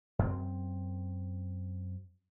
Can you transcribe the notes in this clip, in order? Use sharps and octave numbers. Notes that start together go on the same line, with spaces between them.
F#2 C4